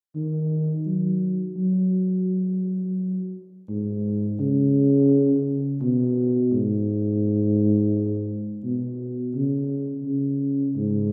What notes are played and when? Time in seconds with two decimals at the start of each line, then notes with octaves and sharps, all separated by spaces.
0.16 D#3
0.86 F#3
1.57 F#3
3.69 G#2
4.40 C#3
5.82 B2
6.53 G#2
8.64 B2
9.35 C#3
10.06 C#3
10.77 G#2